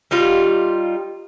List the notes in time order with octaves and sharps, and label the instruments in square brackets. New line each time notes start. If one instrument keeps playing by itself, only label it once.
[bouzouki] G3 D#4 F4 G4